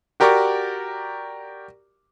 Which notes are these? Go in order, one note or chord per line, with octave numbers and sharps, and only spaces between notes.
F#4 G4 A#4 D5 C#6 D6